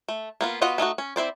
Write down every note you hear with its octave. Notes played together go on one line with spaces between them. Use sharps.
A3
A#3 B3 F4
B3 F4 F#4 D#5 F#5
A3 D#4 F4 F#4
C#4
C4 E4 C5 D5